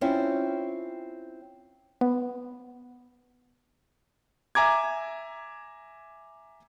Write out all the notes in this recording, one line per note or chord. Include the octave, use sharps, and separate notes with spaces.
C4 C#4 E4 F4
B3
E5 G#5 A#5 D6 G#6